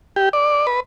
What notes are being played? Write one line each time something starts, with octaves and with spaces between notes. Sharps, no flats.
G4
D5
B4